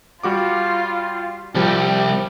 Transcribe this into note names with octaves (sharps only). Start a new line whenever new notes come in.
G3 F4 F#4 D6
C2 F3 G3 G4